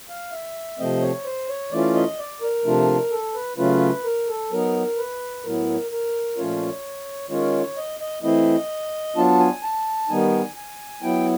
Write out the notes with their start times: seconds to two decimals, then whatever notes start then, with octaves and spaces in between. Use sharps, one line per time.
0.09 F5
0.32 E5
0.79 C3 F3 A3 C4 D#5
1.02 C#5
1.25 C5
1.49 C#5
1.72 E3 A3 C#4 F4 D5
1.95 D#5
2.18 D5
2.41 A#4
2.65 C3 F3 A3 D4 F4
3.11 A4
3.34 B4
3.58 C#3 F#3 A3 C#4 F4 B4
4.04 A#4
4.28 A4
4.51 F#3 B3 D#4 A#4
4.97 B4
5.44 A2 F#3 B3 E4 A#4
5.91 A#4
6.37 A#2 F3 A3 C#4 F4 C#5
7.30 D#3 G#3 C#4 F4 C#5
7.77 D#5
8.00 D#5
8.23 E3 A3 C4 E4 D#5
9.16 F#3 B3 D4 F4 A5
9.39 G#5
9.63 A5
10.09 D#3 G3 B3 D#4 G#5
10.56 G#5
11.02 F#3 B3 E4 G5